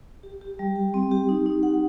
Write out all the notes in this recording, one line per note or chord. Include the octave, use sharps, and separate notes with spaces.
G4
G4
G3
G4
C4
G4
D#4
D#4
F#5